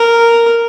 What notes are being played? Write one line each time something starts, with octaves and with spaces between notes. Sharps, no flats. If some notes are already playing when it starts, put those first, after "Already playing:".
Already playing: A#4